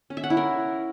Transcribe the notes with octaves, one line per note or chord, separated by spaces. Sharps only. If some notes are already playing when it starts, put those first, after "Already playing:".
C#4
E5
F#5
E4
A#4